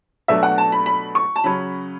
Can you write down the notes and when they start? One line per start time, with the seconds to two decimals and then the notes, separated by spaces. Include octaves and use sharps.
0.28 B2 F#3 A3 D4 E5
0.43 F#5
0.58 A5
0.72 B5
0.86 B5
1.15 C#6
1.36 A5
1.44 C#3 F#3 C#4 B5